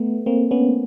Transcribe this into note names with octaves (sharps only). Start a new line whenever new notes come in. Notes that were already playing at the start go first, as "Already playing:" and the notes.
Already playing: A3 B3
A#3 C4
B3 C#4